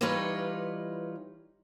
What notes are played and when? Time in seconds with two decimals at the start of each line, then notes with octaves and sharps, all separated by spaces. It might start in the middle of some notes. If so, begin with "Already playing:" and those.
0.01 E3 G3 D#4 F4 B4 C#5